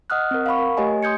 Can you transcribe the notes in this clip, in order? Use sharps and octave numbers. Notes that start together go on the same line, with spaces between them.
D#5 F#5 D#6 F6 F#6
C4 A#4
F5 F#5 B5 C#6
A#4
A3 G4 C#5 D#5 G#5
C6 D#6 G6 G#6 C#7